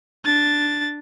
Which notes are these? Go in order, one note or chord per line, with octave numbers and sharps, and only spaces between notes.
D4 A6